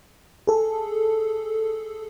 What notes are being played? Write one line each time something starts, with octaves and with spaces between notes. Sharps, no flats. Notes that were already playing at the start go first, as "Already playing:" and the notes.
G#4 A4